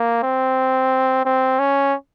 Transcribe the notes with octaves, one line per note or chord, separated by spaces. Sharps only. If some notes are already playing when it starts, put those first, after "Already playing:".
Already playing: A#3
C4
C4
C#4